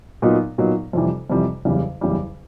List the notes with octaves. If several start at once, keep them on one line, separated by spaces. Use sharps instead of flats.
A#2 F#3 B3 D#4
A#2 F#3 B3 D#4
F2 C3 E3 G3
F2 C3 E3 G3
F#1 E2 C#3 E3 G3
F#1 E2 C#3 E3 G3